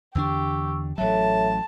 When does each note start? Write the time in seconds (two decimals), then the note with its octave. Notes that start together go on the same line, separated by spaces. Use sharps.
0.15 E2 D3 D4 G4 C#6 E6
0.98 A1 F#3 A4 C#5 E5 A5